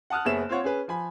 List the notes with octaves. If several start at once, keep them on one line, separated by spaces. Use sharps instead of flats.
F#5 A5 D#6 F6 F#6
F#1 B3 G#4 C#5 E5 E7
C4 F4 C#5 F#5
C#4 G#4 B4
F3 G#5 B5